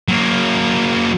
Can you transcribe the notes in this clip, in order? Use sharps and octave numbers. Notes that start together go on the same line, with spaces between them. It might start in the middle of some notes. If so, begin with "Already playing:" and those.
F#3 A#3